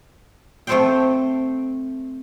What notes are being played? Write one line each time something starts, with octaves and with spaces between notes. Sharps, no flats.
A3 C4 A4 C5 F5 G5